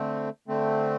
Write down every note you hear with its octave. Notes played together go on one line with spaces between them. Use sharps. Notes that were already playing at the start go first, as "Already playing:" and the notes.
Already playing: D3 A3 C4
D3 A3 C4